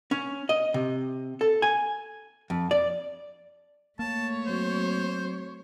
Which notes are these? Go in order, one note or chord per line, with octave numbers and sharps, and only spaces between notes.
C#4
D#5
C3
A4
G#5
F2
D5
A3 A#3 C#5 A5
F#3 C4 F#4 C5